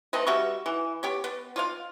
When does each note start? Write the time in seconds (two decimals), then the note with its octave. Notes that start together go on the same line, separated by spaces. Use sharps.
0.13 A3 C4 B4 D#5
0.27 G3 F#4 E5 C#6
0.66 E3
1.03 B3 G4 C#5
1.24 B3
1.56 F4 C#5 F5